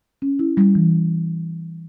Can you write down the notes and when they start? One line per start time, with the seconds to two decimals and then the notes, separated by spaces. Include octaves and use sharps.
0.22 C#4
0.39 E4
0.57 G3
0.75 E3